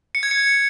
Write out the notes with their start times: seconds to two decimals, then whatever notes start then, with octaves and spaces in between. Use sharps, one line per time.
0.15 C#7
0.23 G#6
0.31 C#7